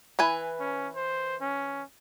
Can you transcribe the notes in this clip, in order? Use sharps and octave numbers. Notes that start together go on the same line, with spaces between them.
E3 B4 G#5
C#4
C5
C#4